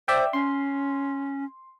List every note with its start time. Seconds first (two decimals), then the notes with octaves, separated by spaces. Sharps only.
0.08 C5 D5 E5 G5
0.33 C#4 C6